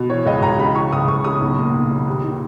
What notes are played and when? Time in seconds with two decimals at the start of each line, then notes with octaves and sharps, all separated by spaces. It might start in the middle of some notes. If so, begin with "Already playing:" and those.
Already playing: B2
0.09 E3 C#5
0.26 C#2 D#5
0.42 C#2 A#5
0.58 C#3 B5
0.75 E3 C#6
0.92 C#2 D#6
1.08 C#2 C#6
1.24 C#3 D#6
1.41 B1
1.58 A#2
1.74 B1
1.91 A#2
2.07 D#2
2.24 D#3